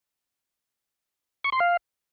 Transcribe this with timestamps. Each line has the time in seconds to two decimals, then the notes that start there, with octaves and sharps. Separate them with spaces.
1.44 C#6
1.52 C6
1.60 F5